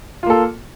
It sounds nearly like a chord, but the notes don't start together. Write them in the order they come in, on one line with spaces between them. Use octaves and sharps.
F4 A#3 A4